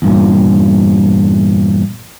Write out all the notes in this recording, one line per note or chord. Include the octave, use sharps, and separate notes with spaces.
E2 G2 A#2